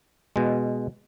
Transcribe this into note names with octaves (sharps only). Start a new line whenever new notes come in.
B2 G#3